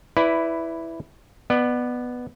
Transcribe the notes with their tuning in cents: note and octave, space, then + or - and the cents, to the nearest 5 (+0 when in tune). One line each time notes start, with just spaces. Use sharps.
E4 +0 B4 +10 D5 -10
B3 +0 D5 +40